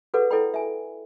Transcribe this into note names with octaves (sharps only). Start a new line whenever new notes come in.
F#4 G#4 A4 B4 D5 F#5
E4 A4 D5 G5 B5
E5 G#5